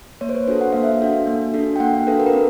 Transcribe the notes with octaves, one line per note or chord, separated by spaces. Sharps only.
A#3 C#5
C5
B4
D4 F#4 A4 C5
F#5
A#3 F5
E5
F5
D4 F#4 A4
A#3
D4 F#4 A4
G5
A#3 F#5
F5
D4 F#4 A4 B4
A#4
B4
C4 A#4